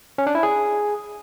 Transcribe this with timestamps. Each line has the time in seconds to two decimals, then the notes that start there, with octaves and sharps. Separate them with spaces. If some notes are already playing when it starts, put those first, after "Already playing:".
0.18 C#4
0.27 D4
0.35 E4
0.43 G#4